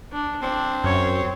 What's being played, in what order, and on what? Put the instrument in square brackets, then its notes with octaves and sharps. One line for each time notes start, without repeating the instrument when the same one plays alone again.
[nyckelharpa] D4
[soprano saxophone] C4 [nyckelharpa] D4
[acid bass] F#2 [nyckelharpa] C#4 C#5